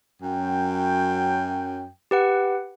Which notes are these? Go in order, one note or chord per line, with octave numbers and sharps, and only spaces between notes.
F#2 G5
G4 B4 F#5